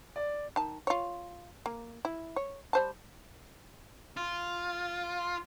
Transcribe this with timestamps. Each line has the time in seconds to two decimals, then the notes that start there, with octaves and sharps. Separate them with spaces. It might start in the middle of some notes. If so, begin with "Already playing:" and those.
0.16 D5
0.56 D#3 A5
0.87 F4 C#5
1.66 A#3
2.05 E4
2.36 C#5
2.73 G3 C5 A5
4.17 F4